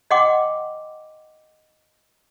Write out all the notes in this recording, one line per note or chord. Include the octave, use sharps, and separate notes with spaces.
D#5 F#5 G5 C6 D6